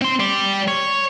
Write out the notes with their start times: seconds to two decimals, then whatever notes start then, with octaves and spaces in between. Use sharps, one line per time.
0.02 C4 C6
0.20 G3 D5
0.68 C#5